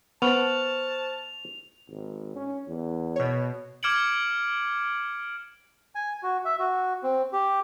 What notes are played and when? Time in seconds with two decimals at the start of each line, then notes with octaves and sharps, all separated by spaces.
0.22 B3 C5 A5 C#6 F6 F7
1.89 G#1
2.36 C#4
2.68 E2
3.16 B2 C#5
3.83 D6 F6 G#6 C#7 D7 F#7
5.95 G#5
6.23 F#4
6.45 E5
6.59 F#4
7.03 C4
7.33 G4